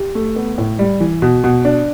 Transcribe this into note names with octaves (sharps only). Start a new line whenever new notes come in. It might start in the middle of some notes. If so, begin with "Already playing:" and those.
Already playing: G4
A3
B3
A2
G3
E3
B2
B2
D4